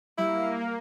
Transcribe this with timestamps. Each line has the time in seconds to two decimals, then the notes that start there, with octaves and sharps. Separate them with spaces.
0.18 G3 A#3 E4